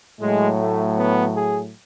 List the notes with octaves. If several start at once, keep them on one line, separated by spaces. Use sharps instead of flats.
A2 F#3 G#3
A3
B3
G#4